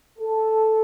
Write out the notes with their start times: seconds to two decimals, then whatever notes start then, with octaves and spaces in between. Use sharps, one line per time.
0.19 A4